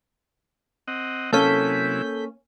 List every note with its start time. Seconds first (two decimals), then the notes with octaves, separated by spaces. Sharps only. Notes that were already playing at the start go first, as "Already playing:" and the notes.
0.88 C4 D#5 F#5
1.33 C3 F#3 A#3 C#4 E4 A4 G6 B6